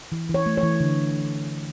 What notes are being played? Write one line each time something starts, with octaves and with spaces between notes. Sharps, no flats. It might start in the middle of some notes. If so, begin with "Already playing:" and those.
E3
E3
C#5
A3
C#5
E3
D3